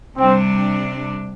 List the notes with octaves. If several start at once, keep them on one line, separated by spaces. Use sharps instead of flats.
C3 G3 C4 D4